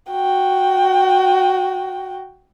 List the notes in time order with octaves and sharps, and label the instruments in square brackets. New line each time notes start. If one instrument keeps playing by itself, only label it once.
[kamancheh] F#4 G5